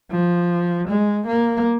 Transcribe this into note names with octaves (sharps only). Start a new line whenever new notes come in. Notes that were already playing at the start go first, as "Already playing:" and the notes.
F3
G#3
A#3